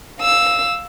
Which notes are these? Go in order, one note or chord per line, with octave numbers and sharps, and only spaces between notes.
F5 E6